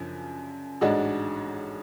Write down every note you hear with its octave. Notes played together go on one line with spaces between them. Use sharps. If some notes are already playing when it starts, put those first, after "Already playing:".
Already playing: F#2 C#3 F3 D4
A1 G#2 G#3 D4 F#4